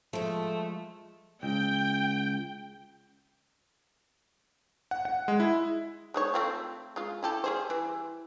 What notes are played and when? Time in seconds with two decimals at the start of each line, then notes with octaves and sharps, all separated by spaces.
0.13 F3 G#3 A3
1.43 C#2 G5
4.91 F#5
5.05 F#5
5.28 G#3
5.40 E4
6.14 G#3 D#4 C#5
6.34 A3 C4 F4
6.96 G#3 F4
7.23 E4 G4 A4
7.44 G3 G#4 C5
7.70 E3